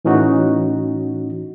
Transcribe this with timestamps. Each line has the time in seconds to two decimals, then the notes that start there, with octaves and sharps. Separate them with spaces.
0.05 A2 E3 C#4 D#4 F#4